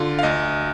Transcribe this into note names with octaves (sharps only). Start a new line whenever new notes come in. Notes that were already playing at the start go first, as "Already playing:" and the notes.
Already playing: D3 F4
F5
D2 D#5